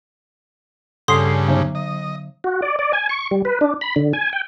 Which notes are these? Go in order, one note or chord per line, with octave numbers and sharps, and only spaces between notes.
G2 C#3 A4 C6 D#6 C7
D3 F#3
D#5
F#4
D5
D5
G#5
C#6
G3
B4
D4
B5
D3
G#5
G5